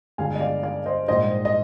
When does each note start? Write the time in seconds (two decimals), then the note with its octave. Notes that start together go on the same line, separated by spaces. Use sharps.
0.18 G1 G2 D3 G#3 F5 G#5
0.35 D#5
0.41 D5 F5
0.63 D5 F5
0.86 C5 D#5
1.08 A#1 G#2 G3 D4 C5 D#5
1.45 D#5